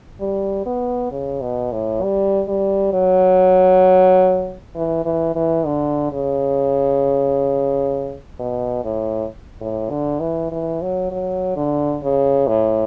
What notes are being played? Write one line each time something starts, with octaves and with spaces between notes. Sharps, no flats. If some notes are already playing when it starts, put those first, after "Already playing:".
G3
B3
C#3
B2
A2
G3
G3
F#3
E3
E3
E3
D3
C#3
B2
A2
A2
D3
E3
E3
F#3
F#3
D3
C#3
A2